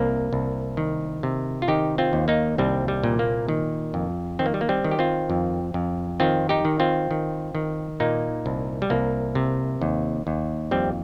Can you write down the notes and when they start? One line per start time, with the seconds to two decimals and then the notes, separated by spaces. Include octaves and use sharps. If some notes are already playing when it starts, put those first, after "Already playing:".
Already playing: C2 C3 A#3
0.33 C2
0.77 D#3
1.23 C3
1.62 F4
1.68 D#3 D#4 G4
1.98 C4 F4
2.13 D#2
2.28 A#3 D#4
2.58 C2 G3 C4
2.88 G3
3.03 A#2
3.19 A#3
3.48 D#3
3.94 F2
4.39 D#3 C4
4.46 A#3
4.54 G3
4.61 A#3
4.69 G3 C4
4.84 D#3
4.91 G4
4.99 C4 F4
5.30 F2
5.74 F2
6.20 D#3 C4 F4
6.49 D#4 G4
6.65 D#3
6.80 C4 F4
7.11 D#3
7.55 D#3
8.00 A#2 A#3 D#4
8.46 C2
8.82 G3
8.90 C2 A#3
9.35 C3
9.82 D#2
10.27 D#2
10.71 F2 G3 C4